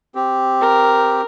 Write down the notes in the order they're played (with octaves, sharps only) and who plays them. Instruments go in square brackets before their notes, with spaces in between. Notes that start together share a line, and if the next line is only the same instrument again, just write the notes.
[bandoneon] C4 G4
[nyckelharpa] A#4